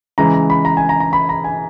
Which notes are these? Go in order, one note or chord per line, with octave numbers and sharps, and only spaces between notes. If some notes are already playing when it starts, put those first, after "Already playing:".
C#3 E3 G#3 A#5
A#5
B5
A#5
G#5
A#5
A#5
B5
A#5
G#5